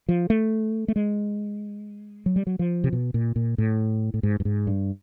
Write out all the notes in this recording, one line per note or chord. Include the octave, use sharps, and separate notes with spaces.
F3
A3
A3
G#3
F#3
G3
F#3
F3
C3
B2
A#2
A#2
A2
A2
G#2
G2
G#2
G2